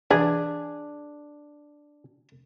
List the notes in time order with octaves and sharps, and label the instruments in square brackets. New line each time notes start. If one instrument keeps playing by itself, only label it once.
[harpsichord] E3 [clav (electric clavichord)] D4 [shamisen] G#4